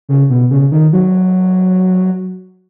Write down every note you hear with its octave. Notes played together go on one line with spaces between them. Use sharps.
C#3
B2
C#3
D#3
F#3